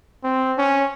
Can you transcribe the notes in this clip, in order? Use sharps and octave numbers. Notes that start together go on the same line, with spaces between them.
C4
C#4